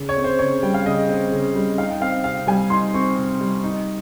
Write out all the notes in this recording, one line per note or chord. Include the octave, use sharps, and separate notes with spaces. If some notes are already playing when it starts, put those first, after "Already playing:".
Already playing: C#3
C#5
C4
C5
C#3 C#5
G3 G5
F5
C#3 D#5
C4 D#5
C#3
G3
D#4 F5
G5
C4 F5
C3 F5
G3 G#5
D#4 C6
C4 C#6
C3
G3
D#4